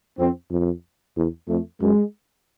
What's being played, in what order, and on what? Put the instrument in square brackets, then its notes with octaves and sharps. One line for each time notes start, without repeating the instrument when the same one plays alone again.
[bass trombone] F2 [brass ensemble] C4
[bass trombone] F2
E2
[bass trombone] F2 [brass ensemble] A3
[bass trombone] F#2 [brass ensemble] G#3